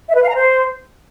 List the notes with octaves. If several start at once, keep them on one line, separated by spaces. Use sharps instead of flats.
E5
B4
F5
A#5
C5